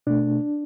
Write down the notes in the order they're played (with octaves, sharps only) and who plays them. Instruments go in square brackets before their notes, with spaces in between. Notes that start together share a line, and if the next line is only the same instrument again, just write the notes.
[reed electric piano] B2 A3 D4